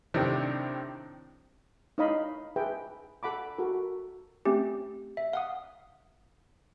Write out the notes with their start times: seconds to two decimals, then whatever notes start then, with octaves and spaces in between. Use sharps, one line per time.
0.14 A2 C3 D#3 C4 D4
1.98 D#4 E4 C#5 D#5 F5 B5
2.56 G#4 B4 E5 G5
3.23 A4 F#5 B5 D6
3.58 F#4 A4 A#4
4.45 A3 C4 C#4 G4
5.17 E5
5.33 F5 F#5 D#6